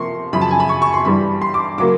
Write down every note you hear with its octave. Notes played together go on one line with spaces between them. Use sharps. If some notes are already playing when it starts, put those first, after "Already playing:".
Already playing: C3 F3 A#3 C6 C#6
F#2 C#3 F3 B5
A5
G#5
B5
C#6
C#6
C6
G2 E3 G3 B5
C6
D6
C#3 F#3 A#3 D6